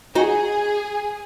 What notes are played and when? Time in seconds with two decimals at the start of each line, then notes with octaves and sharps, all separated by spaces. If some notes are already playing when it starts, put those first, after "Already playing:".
0.15 D#4 F#4 G#4